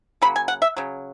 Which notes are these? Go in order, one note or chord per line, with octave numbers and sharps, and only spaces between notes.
C#3 F#3 A#3 B5
G#5
F#5
E5
C#3 F#3